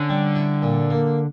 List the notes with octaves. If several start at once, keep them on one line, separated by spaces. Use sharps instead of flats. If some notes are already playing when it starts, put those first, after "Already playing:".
Already playing: D3 C#4
G3
E4
A#2
A#3